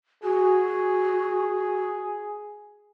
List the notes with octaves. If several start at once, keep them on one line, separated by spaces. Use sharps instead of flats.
F#4 G#4